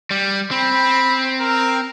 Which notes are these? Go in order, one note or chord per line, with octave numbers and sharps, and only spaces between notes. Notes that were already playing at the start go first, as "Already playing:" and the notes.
G3
C4 B5
A#4